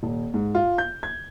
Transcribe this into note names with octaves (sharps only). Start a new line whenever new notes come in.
D#1
G#2
F4
G6
G#6